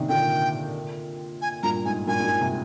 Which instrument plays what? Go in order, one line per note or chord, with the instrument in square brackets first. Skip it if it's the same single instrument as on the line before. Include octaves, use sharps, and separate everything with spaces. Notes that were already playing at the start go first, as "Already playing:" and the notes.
Already playing: [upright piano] C3 D#3 A#3 D4
[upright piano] A#2 D3 [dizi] G5
[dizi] G#5
[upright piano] G2 A#2 [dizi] A#5
[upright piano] G#2 [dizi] G#5
[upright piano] G2 A#2 [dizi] G#5
[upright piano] G#2
G2 A#2
C3